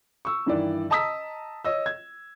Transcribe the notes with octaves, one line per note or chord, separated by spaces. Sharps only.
C#6 E6
G2 D#3 E3 D5
D#5 A5 A#5 D#6 E6 B6
C#5 D#5 E6
G#6